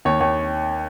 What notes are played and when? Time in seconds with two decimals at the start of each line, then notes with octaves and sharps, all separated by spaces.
0.05 D#2 C#5
0.20 D#2 C#5